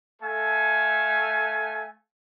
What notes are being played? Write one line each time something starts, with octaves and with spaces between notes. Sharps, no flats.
A3 A4 F5 G#5